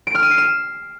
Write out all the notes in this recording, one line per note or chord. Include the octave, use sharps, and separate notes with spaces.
D7
F6
D#7
C7
E7